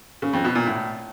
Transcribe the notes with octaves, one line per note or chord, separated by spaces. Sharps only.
C#3
F2
B2
A#2
A2